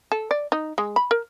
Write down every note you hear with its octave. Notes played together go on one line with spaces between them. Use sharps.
A4
D5
D#4
G#3
B5
A#4